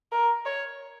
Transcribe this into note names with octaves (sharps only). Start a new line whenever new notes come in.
A#4
C#5